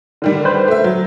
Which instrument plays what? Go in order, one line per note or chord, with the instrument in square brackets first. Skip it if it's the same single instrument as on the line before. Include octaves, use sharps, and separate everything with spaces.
[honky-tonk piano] D3 D#3 G3
[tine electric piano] B4 C5
[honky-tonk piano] A3 E5
F#3